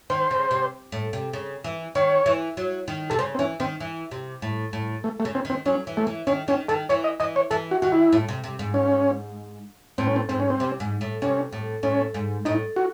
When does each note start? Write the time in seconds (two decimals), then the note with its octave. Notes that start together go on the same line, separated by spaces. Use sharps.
0.10 D#3 C5
0.31 C#3
0.51 C3
0.92 A2
1.13 C3
1.33 C#3
1.64 E3
1.95 D#3 C#5
2.26 E3
2.57 F#3
2.88 D#3
3.10 C3 A4
3.19 C#3 C5
3.35 C4
3.39 E3 C#4
3.60 D#3 C4
3.80 E3
4.11 C3
4.42 A2
4.73 A2
5.04 A3
5.20 A3
5.25 C#3
5.35 C4
5.45 D#3
5.50 C4
5.66 F#3 C#4
5.87 E3
5.97 A3
6.07 E3
6.27 D#3 C#4
6.48 D#3 C#4
6.68 D#3 A4
6.89 E3 C#5
7.04 D#5
7.20 E3 D#5
7.36 C#5
7.51 E3 A4
7.71 F#4
7.82 D#3 F#4
7.92 E4
8.13 A2
8.28 C3
8.44 C3
8.59 G#2
8.74 C#4
9.98 A2 C4
10.07 C#4
10.16 C4
10.29 G#2 C4
10.40 C#4
10.50 C4
10.60 C3
10.80 G#2
11.01 A2
11.22 C3 C#4
11.52 A2
11.83 A2 C#4
12.14 G#2
12.45 A2 D#4
12.76 F#4